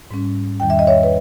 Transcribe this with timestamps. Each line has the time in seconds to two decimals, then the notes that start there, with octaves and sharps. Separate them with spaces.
0.11 G#2 G3 C#4
0.60 E2 D#3 G3 G5
0.70 E5
0.79 D#5
0.87 C#5 E5
1.03 B4